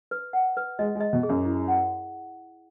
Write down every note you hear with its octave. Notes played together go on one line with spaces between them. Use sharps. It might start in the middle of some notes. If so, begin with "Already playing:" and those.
B4
F#5
B4
G#3 D#5
G#3
D#5
B2
G#4
F#2
E4
F#5